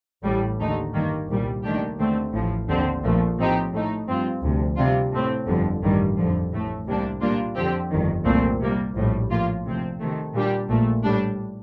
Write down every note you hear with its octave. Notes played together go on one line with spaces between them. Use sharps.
A1 A2 G3
D#2 D3 A3 D#4
G1 G2 D#3 A#3
C2 A#2 G3
D#2 D#3 A3 D4 G4
D#2 D3 A3 C4
A1 A2 F3
D#2 D3 F3 C4
A#1 A#2 F3 A3
A2 F3 C4 D#4 G4
A2 A3 D#4
G2 F3 C4 F4
D2 C3 F3
C3 G3 D4 F4
A2 A3 C4
G1 F2 D3 F3
A1 G2 D#3 G3
F2 D3 F3
A1 A2 A3
C2 C3 G3 A#3 D4
A#2 G3 A#3 D4 F4
F2 D3 F3 C4 G4
G1 F2 D#3
C2 A#2 F3 A3 C4
C3 G3 A#3
A#1 A2 G3
A2 F3 A#3 F4
D2 C3 F3 C4
C3 D#3 A3
A#2 G3 D4 G4
A#1 A#2 A3
A2 G3 D4